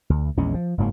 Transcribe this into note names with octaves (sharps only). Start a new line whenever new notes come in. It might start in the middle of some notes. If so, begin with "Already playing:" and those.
D2
A#1 E2 G#3 C#4
F3
F#1 G#2 F#3 A#3